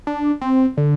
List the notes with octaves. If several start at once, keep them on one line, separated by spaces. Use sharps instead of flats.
D4
C4
D3